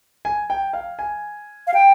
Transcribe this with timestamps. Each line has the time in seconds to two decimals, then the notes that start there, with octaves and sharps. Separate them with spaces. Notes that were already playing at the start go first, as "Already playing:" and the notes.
0.25 G#5
0.50 G5
0.73 F5
0.99 G#5
1.67 F5
1.74 G5